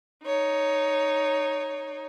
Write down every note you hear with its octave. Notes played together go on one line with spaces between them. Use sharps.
D#4 C#5